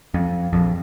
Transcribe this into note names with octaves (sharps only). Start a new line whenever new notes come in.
F2
A#1 F2